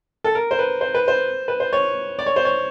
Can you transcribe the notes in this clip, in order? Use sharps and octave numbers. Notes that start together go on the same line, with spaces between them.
A4
A#4
C5
B4
C5
B4
C5
B4
C5
C#5
D5
C#5
C5
C#5